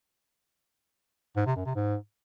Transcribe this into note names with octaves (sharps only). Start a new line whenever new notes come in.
G#2
C3
F#2
C3
G#2